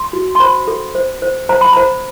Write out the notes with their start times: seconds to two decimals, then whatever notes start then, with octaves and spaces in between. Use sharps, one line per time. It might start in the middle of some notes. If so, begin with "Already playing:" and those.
Already playing: C6
0.13 F#4
0.35 C6
0.40 C5 B5
0.67 A4
0.95 C5
1.22 C5
1.49 C5 A#5
1.61 B5
1.73 C5 A#5